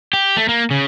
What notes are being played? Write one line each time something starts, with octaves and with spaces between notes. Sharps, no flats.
G4
A3
A#3
C#3